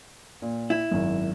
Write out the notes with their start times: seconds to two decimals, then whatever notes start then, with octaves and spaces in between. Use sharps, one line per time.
0.42 A#2
0.70 E4
0.91 G#1 F#2